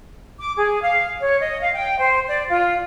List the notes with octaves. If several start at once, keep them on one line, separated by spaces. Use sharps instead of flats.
D6
G#4
F5
C#5
D#5
F5
G5
C5
D5
F4